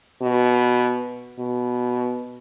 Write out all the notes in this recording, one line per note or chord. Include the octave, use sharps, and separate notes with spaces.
B2
B2